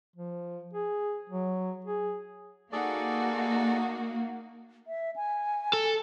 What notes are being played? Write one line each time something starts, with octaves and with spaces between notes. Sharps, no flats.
F3
G#4
F#3
G#4
A#3 D#4 F#4 G#4 A4 D5
E5
G#5
A4